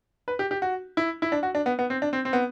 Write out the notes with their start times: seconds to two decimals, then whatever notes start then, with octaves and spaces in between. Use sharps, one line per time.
0.28 B4
0.39 G4
0.51 G4
0.62 F#4
0.97 E4
1.22 E4
1.32 D4
1.43 F#4
1.55 D4
1.66 B3
1.79 B3
1.90 C4
2.02 D4
2.13 C4
2.25 C4
2.33 B3